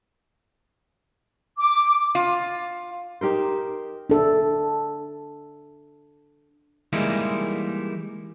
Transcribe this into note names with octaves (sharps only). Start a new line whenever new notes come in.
D6
F4
D#4 G4 A#4 C5
D4 A4
E3 G3 G#3 A#3 D#4 E4